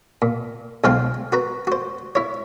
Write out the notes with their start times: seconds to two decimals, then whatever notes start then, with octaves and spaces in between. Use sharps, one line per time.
0.22 A#2
0.84 B1 F3 G#3 C5 F5 G5
1.32 F#4 B4 A#5
1.67 F#4 C5
2.15 E4 C#5